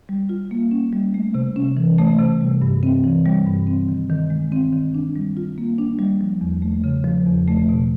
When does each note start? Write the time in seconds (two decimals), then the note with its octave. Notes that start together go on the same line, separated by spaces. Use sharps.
0.09 G3
0.29 F4
0.51 A#3
0.71 C#4
0.93 G3
1.14 A3
1.34 C3
1.56 C#4
1.77 E3
1.98 A3
2.19 C3
2.41 G3
2.62 G2
2.83 C4
3.04 E3
3.26 G3
3.47 G2
3.67 C4
3.89 D#3
4.10 D#3
4.30 G#3
4.52 C4
4.73 D#3
4.95 D4
5.16 G3
5.37 F4
5.58 A#3
5.78 D4
5.99 G3
6.21 F3
6.41 E2
6.62 A3
6.84 C#3
7.04 F3
7.26 E2
7.48 A3
7.69 B2